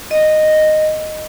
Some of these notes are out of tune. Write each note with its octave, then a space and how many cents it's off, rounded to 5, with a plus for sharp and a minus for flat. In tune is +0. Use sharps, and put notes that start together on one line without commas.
D#5 -10